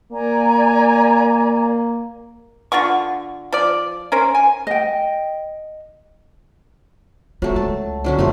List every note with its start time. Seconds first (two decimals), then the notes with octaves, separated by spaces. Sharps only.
0.12 A#3 D5 G#5 A#5
2.72 D3 F4 F#5 C#6
3.52 F3 D5
4.12 C#4 A#4 C5
4.35 G#5
4.67 D#5 G5
7.42 F#3 A3 F4
7.56 C#2 A5
8.04 D3 F#3 C#4
8.19 F#2 C3 F3 A3